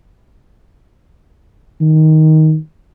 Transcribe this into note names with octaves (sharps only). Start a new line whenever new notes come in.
D#3